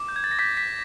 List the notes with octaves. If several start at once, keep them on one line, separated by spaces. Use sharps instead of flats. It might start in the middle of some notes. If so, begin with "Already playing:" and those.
Already playing: D6
G6
G#6
A6
A#6
D6 G6 B6
B6